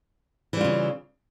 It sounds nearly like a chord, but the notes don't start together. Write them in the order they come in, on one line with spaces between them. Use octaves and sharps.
E3 G3 F4 C#3